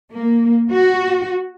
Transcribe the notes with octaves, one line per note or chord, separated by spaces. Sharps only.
A#3
F#4